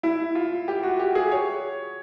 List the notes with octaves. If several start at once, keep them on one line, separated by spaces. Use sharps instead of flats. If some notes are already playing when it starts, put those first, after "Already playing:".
E4
F4
G4
F#4
G4
G#4
C#5